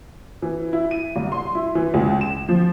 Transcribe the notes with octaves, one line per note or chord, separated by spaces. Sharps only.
E3
E4
D#7
C2
C6
E4
E3
C#2
E7
F3